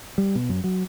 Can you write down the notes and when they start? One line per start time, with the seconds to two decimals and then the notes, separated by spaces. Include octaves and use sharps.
0.18 G3
0.35 B2
0.49 F#2
0.64 F#3